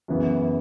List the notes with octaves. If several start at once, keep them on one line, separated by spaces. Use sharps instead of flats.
F#2 C#3 E3 B3